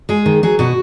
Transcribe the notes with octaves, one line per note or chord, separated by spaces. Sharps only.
G#3 G#4
D#3
F#3 G#4
B2 F#4